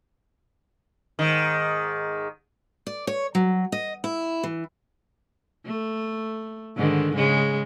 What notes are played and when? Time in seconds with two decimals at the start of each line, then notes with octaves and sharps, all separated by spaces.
1.19 G#2 D#3
2.87 D5
3.07 C#5
3.35 F#3
3.72 D#5
4.04 E4
4.43 E3
5.66 A3
6.77 G#2 D3 D#3
7.15 C#3 G#3